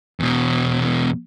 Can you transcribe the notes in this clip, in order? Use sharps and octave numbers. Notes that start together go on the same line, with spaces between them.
E2 B2